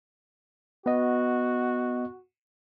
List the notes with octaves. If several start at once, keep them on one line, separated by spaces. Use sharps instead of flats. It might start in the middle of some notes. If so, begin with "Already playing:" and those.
B3 F#4 D#5